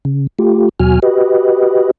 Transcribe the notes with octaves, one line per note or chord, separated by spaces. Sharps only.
C#3
A3 F4 G4
D#2 B2 F#3 F#4 G#5 F6
F#4 G4 B4 D#5